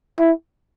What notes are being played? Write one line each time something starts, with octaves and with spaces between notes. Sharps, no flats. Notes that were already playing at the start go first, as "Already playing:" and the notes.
E4